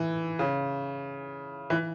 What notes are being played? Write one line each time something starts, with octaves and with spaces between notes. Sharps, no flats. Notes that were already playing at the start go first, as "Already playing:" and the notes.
Already playing: E3
C#3
E3